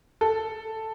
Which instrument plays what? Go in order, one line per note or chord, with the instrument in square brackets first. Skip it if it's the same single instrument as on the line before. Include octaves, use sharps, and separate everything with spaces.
[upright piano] A4